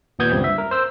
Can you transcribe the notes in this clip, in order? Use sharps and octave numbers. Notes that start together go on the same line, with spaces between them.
D#2 A#2 B3 D#6 G6 G#6
C#2 G2 G3 C4
E5
A#4
C5 E6